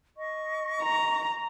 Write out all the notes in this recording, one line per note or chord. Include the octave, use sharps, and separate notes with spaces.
D#5 C#6
A#5